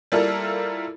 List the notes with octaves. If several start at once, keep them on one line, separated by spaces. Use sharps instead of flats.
G3 A#3 E4 F4 A4 A#4